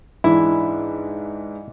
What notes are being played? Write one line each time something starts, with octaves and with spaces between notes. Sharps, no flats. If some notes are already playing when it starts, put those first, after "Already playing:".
G#2 E3 D4 E4